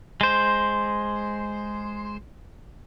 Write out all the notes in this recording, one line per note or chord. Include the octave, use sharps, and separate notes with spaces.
G#3 C5